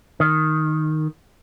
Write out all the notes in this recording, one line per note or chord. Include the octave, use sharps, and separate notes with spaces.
D#3